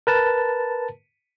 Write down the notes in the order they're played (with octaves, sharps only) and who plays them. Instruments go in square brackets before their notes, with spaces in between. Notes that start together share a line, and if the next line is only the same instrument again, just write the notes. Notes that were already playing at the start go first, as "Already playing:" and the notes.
[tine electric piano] A#4 B4 A5